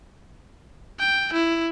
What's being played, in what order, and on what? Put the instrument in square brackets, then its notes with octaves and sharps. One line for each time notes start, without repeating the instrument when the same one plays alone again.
[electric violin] G5
E4